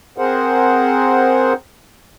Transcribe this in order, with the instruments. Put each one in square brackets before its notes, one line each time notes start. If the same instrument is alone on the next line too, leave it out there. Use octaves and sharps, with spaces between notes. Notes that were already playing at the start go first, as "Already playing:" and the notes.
[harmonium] C4 G#4 A#4 C5 F#5